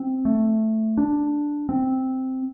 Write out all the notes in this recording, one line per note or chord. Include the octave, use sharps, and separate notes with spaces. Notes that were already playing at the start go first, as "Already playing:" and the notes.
Already playing: C4
A3
D4
C4